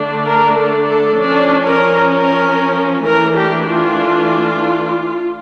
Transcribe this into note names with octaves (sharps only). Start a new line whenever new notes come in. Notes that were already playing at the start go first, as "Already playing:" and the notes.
Already playing: D3 A3 D4
A#4
A4
A4
F3 C#4 D4
A#4
A#4
E3 A3 D4 A#4
G4
F4